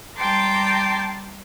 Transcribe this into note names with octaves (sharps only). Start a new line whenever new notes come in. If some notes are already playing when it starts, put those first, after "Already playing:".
G3 G5 A5 A#5 C6 D6